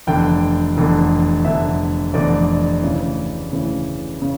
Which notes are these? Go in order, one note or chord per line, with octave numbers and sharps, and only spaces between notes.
F1 E2 D3 G5
F1 E2 D3
F1 E2 D3 E5
F1 E2 D3 D5
D2 C#3 E3
D2 C#3 E3
C#3